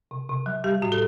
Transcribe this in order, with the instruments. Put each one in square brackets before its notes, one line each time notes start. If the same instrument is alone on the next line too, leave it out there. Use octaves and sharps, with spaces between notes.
[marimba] C3
C3
F#3
G3 G4
A2 F#4
A4